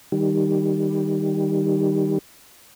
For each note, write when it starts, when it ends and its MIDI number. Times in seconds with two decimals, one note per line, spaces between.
0.12 2.19 51
0.12 2.19 55